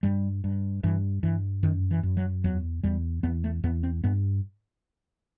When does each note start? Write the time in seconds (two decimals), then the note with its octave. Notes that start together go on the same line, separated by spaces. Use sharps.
0.03 G2 G3
0.44 G2
0.83 G2 E3
1.23 G2 E3
1.63 F#2 D#3
1.91 E3
2.03 F#2
2.17 F#3
2.44 E2 F#3
2.83 E2 G3
3.23 E2 B3
3.44 A3
3.64 E2 B3
3.83 C4
4.04 G2 B3